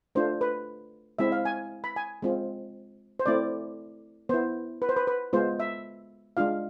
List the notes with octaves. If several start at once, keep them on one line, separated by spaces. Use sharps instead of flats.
A3 D4 F4 C5
B4
G#3 C4 E4 E5
F5
G#5
B5
G#5
G#3 C4 F4
C5
A3 C4 E4 D5
B3 E4 C5
B4
C5
B4
B4
G#3 B3 F4 C5
E5
G#3 D4 F4 F5